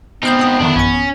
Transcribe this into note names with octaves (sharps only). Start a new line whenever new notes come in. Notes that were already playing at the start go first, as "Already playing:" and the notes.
B3 C4 D#4 G5 F6 G6
B5 D#6
F2 D3 D#3 D4 E4
A1 F#2 C#4 C#7